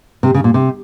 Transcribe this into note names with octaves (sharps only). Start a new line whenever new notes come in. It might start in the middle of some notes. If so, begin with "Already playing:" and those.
C3
C#3
A#2
C3